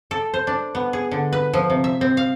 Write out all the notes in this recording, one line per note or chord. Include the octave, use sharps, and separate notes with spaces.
A4
C5
D4
B3
G#4
D3
B4
F3
C3
E5
C4
F5